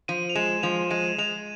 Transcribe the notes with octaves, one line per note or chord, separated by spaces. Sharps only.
F3 D#7
F7
G#3 E7
F3 F7
G#3 D#7
G#3 F7